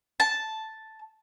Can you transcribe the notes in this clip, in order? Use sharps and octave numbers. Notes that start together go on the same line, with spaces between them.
A5